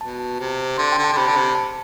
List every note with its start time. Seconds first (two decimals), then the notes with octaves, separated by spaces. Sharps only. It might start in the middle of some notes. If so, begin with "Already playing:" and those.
0.01 B2 A5
0.40 C3
0.78 D3 C6
0.92 G5
0.98 D3
1.04 A5
1.13 D3
1.16 C3 B5
1.28 D3
1.36 C3
1.55 A5